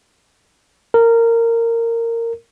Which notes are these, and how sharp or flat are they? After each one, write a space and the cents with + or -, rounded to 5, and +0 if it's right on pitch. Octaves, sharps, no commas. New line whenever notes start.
A#4 -15